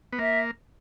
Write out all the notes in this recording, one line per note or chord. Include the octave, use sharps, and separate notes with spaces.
B3
A#3 E5